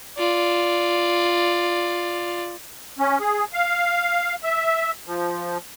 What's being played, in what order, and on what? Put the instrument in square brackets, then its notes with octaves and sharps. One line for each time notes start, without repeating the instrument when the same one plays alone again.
[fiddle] F4 D5
[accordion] C#4
G#4
F5
E5
F3